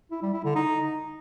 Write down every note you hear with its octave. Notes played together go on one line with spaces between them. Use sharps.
E4
G3
E4
D3
D#4